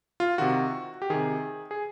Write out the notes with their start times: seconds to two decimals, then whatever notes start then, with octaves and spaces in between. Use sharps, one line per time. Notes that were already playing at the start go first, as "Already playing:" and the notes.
0.20 F4
0.38 C3 D#3 F#4
1.02 G4
1.10 C3 D#3 G#4
1.71 G#4